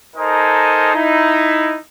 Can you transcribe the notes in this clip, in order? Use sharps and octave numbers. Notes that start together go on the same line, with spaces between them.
D#4 A4 A#4 C5 D#5 G#5
D#4 E4